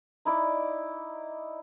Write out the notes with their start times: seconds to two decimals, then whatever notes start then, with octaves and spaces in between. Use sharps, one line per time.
0.25 D#4 E4 D5